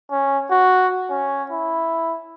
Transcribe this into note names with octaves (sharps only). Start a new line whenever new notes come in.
C#4
F#4
C#4
E4